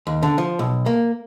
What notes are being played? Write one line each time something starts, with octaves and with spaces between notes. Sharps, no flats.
D#2
D3
F3
B1
A#3